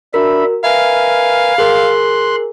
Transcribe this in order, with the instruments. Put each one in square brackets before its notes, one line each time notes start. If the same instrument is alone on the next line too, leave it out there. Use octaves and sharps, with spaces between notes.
[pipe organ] D4 E5 B5 [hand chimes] F#4 A#4
[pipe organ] A#4 B4 G#5 [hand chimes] E5 [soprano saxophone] F5
[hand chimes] G#4 A#4 [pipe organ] C6 F#6